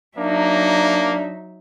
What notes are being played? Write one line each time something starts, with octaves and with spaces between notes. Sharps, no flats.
F#3 A#3 D4 D#4 E5